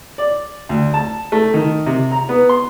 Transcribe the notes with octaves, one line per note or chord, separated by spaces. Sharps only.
D5
D2
A5
A3
D#3
C3
A#5
B3
C6